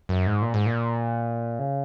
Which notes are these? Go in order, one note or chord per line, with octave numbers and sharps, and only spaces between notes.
F#2
G#2
A#2
G#2
A#2
C#3